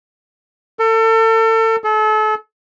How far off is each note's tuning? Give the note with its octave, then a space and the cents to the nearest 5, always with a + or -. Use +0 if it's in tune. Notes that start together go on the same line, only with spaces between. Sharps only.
A4 +35
A4 -35